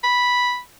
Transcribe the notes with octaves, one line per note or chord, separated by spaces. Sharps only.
B5